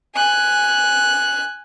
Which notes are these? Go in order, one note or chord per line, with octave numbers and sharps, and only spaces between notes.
G#5 F#6